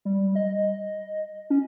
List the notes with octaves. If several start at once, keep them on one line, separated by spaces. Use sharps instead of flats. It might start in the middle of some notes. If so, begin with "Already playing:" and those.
G3
D#5
C#4